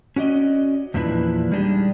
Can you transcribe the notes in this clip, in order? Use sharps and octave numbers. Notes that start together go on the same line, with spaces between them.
C#4 F#4 D5 D#5
E2 A#2 F3 D4 E4 B4
G3 G#3 D4 D#4 G4